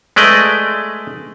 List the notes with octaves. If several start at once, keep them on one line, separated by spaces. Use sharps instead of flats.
G#3 A3 B4 D5 D#5